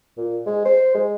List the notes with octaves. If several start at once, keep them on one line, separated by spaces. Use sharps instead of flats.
A#2
G#3
C5
G#3